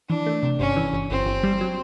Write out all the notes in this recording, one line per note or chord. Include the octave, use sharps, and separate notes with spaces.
E3 D4
A3
C3
G1 C#4
E3
G1
G1 C4
G1
G3
F#3